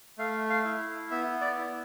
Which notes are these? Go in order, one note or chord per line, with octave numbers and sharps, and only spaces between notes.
A3 F5
F5
E4
B3 E5
D5
E4